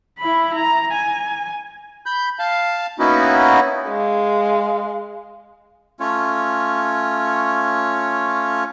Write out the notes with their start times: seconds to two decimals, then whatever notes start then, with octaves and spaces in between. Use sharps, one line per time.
0.19 E4 B5
0.55 A#5
0.92 G#5
2.06 B5 G6
2.39 F5 A5
2.99 A#3 B3 C#4 D#4 E4 F#4
3.88 G#3 F5
6.00 A3 C#4 F4 C#5